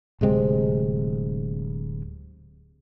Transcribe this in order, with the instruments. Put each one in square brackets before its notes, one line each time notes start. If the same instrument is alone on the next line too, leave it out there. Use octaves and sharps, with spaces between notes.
[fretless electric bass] D1 C3 G#3 C4